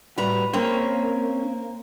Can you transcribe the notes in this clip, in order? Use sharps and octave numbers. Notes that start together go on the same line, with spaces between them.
A2 G3 F#4 B4 A#5
A#3 C4 C#4 A#4 C5 C#5